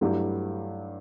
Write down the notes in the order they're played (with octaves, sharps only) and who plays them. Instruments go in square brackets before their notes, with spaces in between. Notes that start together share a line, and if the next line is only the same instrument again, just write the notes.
[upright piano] G2 F#3 A3 E4 G4